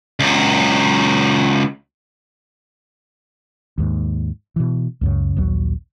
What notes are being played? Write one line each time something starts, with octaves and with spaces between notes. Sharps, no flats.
C#2 F#3
D#2 G#2
B2 E3
C#2 F#2 C#3
A#1 D#2 F#3